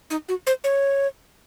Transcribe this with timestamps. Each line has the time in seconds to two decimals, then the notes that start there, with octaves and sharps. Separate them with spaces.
0.10 D#4
0.29 F#4
0.47 C5
0.64 C#5